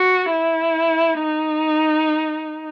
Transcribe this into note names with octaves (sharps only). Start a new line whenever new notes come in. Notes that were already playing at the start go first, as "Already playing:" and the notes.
Already playing: F#4
E4
D#4